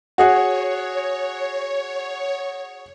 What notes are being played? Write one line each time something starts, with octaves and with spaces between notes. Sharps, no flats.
F#4 G#4 C#5 F#5